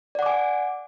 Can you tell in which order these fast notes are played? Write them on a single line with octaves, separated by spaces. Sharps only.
D5 F#5 D6 G#5